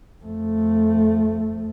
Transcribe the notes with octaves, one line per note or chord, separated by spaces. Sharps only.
F2 A3